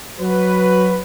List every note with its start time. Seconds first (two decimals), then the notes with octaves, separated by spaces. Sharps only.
0.20 F#3 F#4 B4